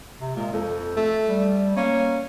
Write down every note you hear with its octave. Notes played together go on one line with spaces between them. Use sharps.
C3
A#2 G#3
F2 A4
A3
G3
A#3 C#4